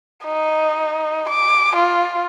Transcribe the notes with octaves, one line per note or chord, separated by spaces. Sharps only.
D#4
D6
F4